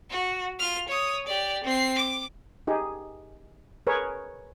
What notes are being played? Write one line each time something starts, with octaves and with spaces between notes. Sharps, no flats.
F#4
F4 F6
C#5 D#6
G4 D5
C4 C7
D6
D#4 G4 G#4
G#4 A#4 B4 C#5